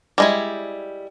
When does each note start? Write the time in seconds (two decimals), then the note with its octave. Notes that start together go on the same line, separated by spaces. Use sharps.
0.18 G3 G#3 E4